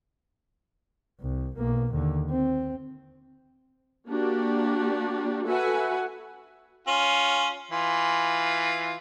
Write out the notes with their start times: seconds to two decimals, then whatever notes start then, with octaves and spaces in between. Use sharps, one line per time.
1.20 C2
1.58 B1 A#3
1.93 D#2 D3
2.30 C4
4.07 A#3 D4 F#4 G4
5.46 F#4 A4 B4 E5 F#5 G#5
6.87 C#4 F4
7.71 E3 F4